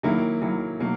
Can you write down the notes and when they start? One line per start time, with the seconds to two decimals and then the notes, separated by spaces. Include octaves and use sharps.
0.03 D#3 F#3 A#3 E4
0.42 D#3 F#3 A#3 E4
0.80 B2 F#3 A#3 D#4